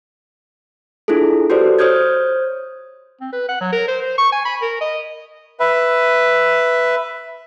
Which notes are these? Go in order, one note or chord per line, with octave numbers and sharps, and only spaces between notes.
D4 E4 F4 G#4 A4
F#4 G4 A4 B4 C5 D5
C5 C#5 D#6 F6 G6 G#6
C4
B4
F#5
F#3
A#4
C5
C5
C#6
G#5
B5
A#4
D#5
B4 E5